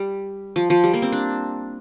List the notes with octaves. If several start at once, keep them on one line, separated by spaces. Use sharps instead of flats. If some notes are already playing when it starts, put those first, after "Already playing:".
Already playing: G3
F3
F3
G3
A#3
C4
D4